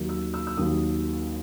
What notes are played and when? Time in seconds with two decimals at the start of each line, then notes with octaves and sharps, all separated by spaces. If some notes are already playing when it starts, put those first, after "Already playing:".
Already playing: D#2 D#3 F#3
0.09 E6
0.34 E6
0.47 E6
0.57 D#2 D#3 F#3 D#6